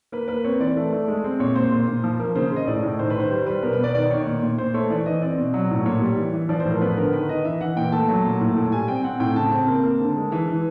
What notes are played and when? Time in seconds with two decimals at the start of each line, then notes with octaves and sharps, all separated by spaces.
0.12 A#3 B4
0.28 A#3 B4
0.44 C4 C#5
0.60 E3 D5
0.77 A3
0.92 A3
1.08 G#3
1.24 C4
1.40 A#2 C#5
1.56 A#2 C5
1.72 A#2
1.88 A#2
2.04 F3
2.20 A#3
2.35 C#3 C5
2.51 C#3
2.56 D#5
2.67 A2 D5
2.83 A2
2.99 D#3 C5
3.10 B4
3.15 D#3 C5
3.31 G3 C5
3.46 G3 B4
3.63 B2 A#4
3.73 B4
3.79 B2
3.84 D5
3.95 D#3 D5
4.10 D#3 C#5
4.27 A#2
4.43 A#2
4.58 A#2 C5
4.74 A3 C#5
4.90 E3 D5
5.06 E3 D#5
5.22 C4 D5
5.38 B2
5.54 F#3
5.70 A2
5.86 A#2 C#5
6.02 G3
6.17 E3
6.33 E3
6.49 F3 D5
6.60 C5
6.65 A2
6.71 A#4
6.81 B3 B4
6.97 D3 A#4
7.13 D#3 B4
7.29 D#3 D#5
7.45 E3 E5
7.61 E3 F#5
7.76 A#2 G5
7.92 A3 A5
8.09 F#3
8.25 A#2
8.40 A2
8.56 A2
8.72 G3 G#5
8.88 C4 G5
9.04 C4 F#5
9.20 A2 G5
9.36 C#3 A5
9.52 C4
9.68 A#3
9.84 A#3
9.99 D3
10.16 G#3
10.32 E3
10.48 E3